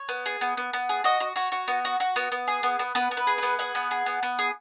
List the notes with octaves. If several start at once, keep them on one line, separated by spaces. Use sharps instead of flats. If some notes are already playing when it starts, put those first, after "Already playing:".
Already playing: C#5
B3
G#4
B3
B3
B3
G#4
F#4 D#5
F#4
F#4 C#5
F#4
B3
F#4
F#4
B3
B3
G#4
B3
B3
B3 B4
B3
B4
G#4
B3 B4
G#4 F#5
B3
G#4
B3
B3
G#4